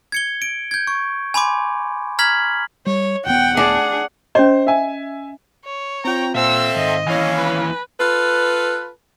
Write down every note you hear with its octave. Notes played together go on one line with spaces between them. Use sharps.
G#6 C#7 G7
D7
G6 G#6
C#6
G#5 B5 C6 D6
A#5 F6 G#6 B6 F#7
G3 C#5
D#1 B3 F#5 G5
D4 G#4
C#4 C5 D#5
E5 G#5
C#5
C4 F4 G5 A#5
A#2 C4 A4 E5 F5 E6
G#2 D#3 D#5
D#2 E3 C#4 E4 F5 G#5 A#6
B4
F4 A4 B4